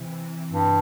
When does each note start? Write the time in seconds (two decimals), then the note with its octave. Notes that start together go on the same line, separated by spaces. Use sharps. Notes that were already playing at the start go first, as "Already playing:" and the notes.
Already playing: C3 E3
0.52 G2